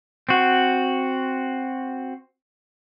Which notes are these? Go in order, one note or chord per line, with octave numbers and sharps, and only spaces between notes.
C4 F#4